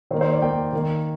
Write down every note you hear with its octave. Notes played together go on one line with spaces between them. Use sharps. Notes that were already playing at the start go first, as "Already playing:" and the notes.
D#3 A#3 C5
C5
D5
D#3 A#3 G5
D#3 A#3